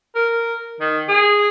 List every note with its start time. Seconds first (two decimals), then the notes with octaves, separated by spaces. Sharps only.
0.16 A#4
0.80 D#3
1.09 G#4